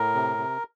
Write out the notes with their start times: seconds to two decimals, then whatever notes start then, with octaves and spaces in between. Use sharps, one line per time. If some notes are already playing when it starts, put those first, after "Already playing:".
Already playing: A2 A#4
0.14 C3
0.37 C3